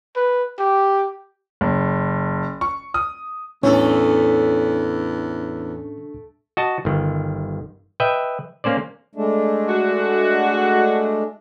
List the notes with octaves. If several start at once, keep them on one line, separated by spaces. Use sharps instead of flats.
B4
G4
F#1
C#6
D#6
E2 A2 A3 C#4 D4 A4 C#5 C#6
F#4 D#5 A5
G1 D#3
B4 D#5 E5 G5
A#3 C#4 C5 D5
G#3 A3 D4
F#4